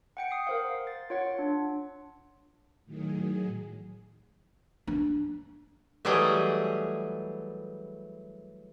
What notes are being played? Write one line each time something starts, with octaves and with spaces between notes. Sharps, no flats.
F#5 G5 C#7
D#6 C7
A#4 C5 F5
A6
F4 C#5 F#5
D4
A2 D#3 F#3 G#4
D4
E3 F#3 G3 A3 G#4 D#5